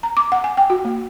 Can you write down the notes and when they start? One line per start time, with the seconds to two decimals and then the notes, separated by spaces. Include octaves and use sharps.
0.03 A#5
0.17 D6
0.32 F#5
0.44 G#5
0.57 G5
0.70 F#4
0.85 A#3